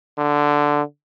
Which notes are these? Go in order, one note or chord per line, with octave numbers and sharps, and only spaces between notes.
D3